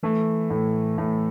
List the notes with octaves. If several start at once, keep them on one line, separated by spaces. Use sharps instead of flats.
E3 A3
A2
A2